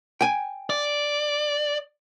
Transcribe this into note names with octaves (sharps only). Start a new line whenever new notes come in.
G5 G#5
D5